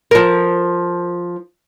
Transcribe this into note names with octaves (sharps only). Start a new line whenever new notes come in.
F3 A#4